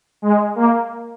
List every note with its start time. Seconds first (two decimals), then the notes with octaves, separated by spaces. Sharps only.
0.22 G#3
0.55 A#3